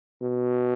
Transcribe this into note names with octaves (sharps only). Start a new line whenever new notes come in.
B2